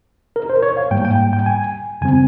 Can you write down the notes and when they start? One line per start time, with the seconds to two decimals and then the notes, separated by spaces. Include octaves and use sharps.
0.36 A#4
0.50 C5
0.63 C#5
0.77 F5
0.91 G#2 G3 A#3 G5
1.05 G5
1.33 G5
1.46 G#5
2.01 F2 C#3 G3 C4 G#5